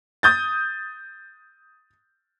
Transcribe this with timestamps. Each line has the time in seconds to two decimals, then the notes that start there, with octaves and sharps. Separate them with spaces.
0.23 D#6 G6 A6